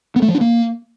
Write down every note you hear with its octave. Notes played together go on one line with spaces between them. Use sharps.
B3
A3
F3
D4
A#3